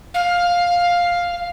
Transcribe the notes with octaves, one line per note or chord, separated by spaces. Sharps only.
F5